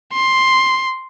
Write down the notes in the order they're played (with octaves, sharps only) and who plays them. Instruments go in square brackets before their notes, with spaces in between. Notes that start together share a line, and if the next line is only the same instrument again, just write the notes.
[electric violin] C6